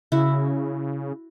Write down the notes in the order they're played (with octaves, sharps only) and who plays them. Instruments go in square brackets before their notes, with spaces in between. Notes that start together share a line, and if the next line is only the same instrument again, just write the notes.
[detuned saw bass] C#3 [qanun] E4 F#4